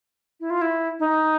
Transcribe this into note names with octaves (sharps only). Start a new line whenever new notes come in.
E4
F4
E4
D#4